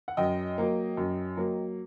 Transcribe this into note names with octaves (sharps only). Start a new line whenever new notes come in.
F#5
F#2 D#5 G5
F#3 A#3
F#2
F#3 A#3